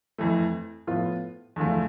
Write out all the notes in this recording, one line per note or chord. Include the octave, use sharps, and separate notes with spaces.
F2 E3 A3
A2 F3 B3 F4
E2 D3 F3 A3